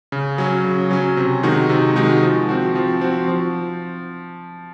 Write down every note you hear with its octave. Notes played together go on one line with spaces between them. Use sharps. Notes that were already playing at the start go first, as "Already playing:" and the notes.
C#3
F#3 C#4
C#3
F#3 C#4
C3
D#3 G#3 D#4 F#4
C3
D#3 G#3 D#4 F#4
F3
C4 F#4
F3
C4 F#4
F3